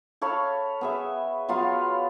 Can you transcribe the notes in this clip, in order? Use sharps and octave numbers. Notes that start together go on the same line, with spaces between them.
A4 C#5 F5 B5
B3 G#4 E5
F#3 B3 F4 F5